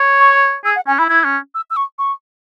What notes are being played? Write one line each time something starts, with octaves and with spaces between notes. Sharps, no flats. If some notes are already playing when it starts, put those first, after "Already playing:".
Already playing: C#5
C#6
G#4 E6
F#5
C#4 G#5
E4 B5
E4 G#6
C#4
E6
E6
C#6
C#6